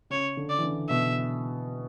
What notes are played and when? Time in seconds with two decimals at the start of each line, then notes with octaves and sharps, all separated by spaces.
0.10 C#3 C#5
0.37 D3
0.50 D5
0.59 E3
0.63 D3
0.89 B2 E5